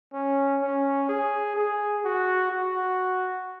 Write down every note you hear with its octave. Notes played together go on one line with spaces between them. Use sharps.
C#4
C#4
G#4
G#4
F#4
F#4